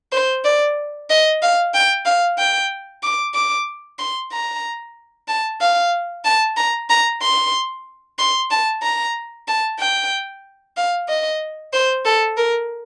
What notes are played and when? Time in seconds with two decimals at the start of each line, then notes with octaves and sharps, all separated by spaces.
0.12 C5
0.44 D5
1.10 D#5
1.42 F5
1.74 G5
2.06 F5
2.38 G5
3.03 D6
3.34 D6
3.99 C6
4.32 A#5
5.28 A5
5.61 F5
6.25 A5
6.57 A#5
6.90 A#5
7.22 C6
8.19 C6
8.51 A5
8.83 A#5
9.48 A5
9.79 G5
10.77 F5
11.08 D#5
11.73 C5
12.05 A4
12.37 A#4